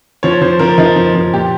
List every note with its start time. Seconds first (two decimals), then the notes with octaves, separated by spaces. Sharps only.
0.23 F3 C#5
0.41 F3 C5
0.59 F3 A#4
0.78 F3 D#4
0.96 F3
1.15 F3
1.33 A#2 G4